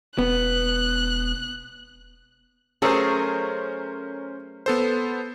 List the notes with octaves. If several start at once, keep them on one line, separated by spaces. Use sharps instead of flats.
E1 B3 F#6
F#3 A3 C#4 G#4 A#4 C5
B3 A4 C5